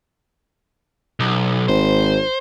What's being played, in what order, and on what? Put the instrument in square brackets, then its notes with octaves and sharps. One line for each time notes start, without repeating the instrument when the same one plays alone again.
[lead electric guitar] B1
[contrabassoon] G#1 [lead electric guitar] C5